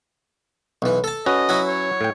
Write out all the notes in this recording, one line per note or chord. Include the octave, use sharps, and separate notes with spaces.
B1 E3
A4 A5
C#4 F#4 B4 D#5
F#3 E4 F#5
C#5
A2 G5